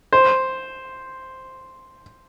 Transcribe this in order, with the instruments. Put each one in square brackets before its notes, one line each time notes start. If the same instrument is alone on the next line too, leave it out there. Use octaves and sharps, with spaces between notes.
[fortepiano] C5